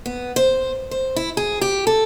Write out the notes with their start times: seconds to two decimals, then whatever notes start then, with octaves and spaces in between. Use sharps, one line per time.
0.06 B3
0.36 C5
0.91 C5
1.16 E4
1.37 G#4
1.61 G4
1.87 A4